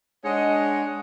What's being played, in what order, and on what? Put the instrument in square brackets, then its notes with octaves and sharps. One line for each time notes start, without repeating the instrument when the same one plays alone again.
[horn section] G#3 D4 C#5 D#5 F#5